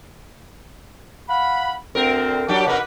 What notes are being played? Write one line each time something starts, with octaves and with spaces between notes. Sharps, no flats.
F5 F#5 B5
D2 C4 A#4
F#3 D4 G4
C3 D#4 F#4 A#4 B4